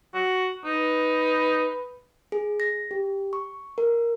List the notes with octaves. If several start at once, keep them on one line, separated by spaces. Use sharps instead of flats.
F#4
D#4 B4
G#4
A#6
G4
C#6
A#4